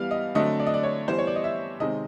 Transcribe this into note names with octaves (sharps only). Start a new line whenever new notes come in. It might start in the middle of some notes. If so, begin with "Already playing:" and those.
Already playing: E3 G3 B3 F5
D#5
D3 F#3 A3 C4 D#5
D5
D#5
D5
C#5
E3 G3 B3 C5
C#5
D5
D#5
E5
C3 D#3 G#3 C4 D#5